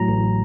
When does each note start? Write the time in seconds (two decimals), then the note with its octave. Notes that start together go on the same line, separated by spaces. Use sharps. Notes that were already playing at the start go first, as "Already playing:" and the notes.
Already playing: A2 F#3 A#5
0.08 A1